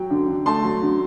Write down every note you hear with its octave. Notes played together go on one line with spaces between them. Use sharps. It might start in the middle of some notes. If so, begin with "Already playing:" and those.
Already playing: F#3 G5
D3
D3
A3 A5 C6
F#3
D3